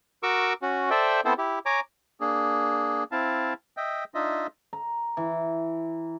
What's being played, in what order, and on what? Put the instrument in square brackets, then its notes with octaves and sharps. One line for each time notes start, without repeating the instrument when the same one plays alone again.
[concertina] F#4 A#4 C#6 D6 E6
C#4 F#4
A4 C5 D5 E5 G5
B3 C4 E4 A4 C5
E4 G4
C#5 G#5 A#5 D6
A#3 D4 G#4
C4 E4 F5 A5
D#5 E5 G5
D4 D#4 F4 D#5 E5
[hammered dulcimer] A#5
E3